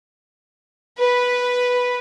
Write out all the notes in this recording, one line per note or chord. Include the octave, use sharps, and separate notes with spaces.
B4